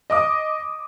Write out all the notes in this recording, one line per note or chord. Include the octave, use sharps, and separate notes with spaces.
D#5 D6 D#6